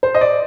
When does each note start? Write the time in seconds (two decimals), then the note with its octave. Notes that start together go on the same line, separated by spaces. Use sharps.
0.03 C5
0.15 D#5
0.21 D5